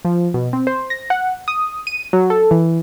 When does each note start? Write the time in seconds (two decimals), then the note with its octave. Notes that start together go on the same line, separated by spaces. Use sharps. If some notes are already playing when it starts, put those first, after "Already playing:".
0.05 F3
0.34 B2
0.53 C4
0.67 C5
0.90 A#6
1.10 F#5
1.48 D#6
1.87 D#7
2.13 F#3
2.30 A4
2.51 E3